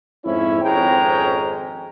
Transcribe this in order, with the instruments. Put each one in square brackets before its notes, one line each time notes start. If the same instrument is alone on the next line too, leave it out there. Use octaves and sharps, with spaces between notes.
[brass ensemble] F2 G#2 C#4 E4
G#1 F2 G#3 C#4 G5 A#5